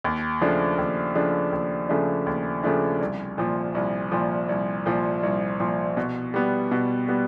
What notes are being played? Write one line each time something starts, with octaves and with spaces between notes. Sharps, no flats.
D#2
C#3 F3 A3 D4
D#2
C#3 F3 A3 D4
D#2
C#3 F3 A3 D4
D#2
C#3 F3 A3 D4
C2
A#2 F3
C2
A#2 F3
C2
A#2 F3
C2
A#2 F3
B2
G3 B3
B2
G3 B3